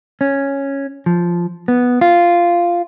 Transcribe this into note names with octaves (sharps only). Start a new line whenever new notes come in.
C#4
F3
B3
F4